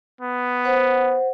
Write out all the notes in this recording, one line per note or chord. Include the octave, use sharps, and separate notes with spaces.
B3
C5 F#5